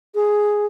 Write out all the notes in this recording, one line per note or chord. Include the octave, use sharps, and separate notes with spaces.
G#4